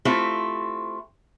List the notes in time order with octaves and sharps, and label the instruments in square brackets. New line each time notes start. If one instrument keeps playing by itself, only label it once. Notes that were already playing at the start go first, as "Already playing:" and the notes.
[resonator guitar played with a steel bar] A3 C4 E4 F4 G4